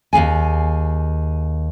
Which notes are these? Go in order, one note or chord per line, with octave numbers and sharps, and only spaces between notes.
D#2 B2 G#4 G#5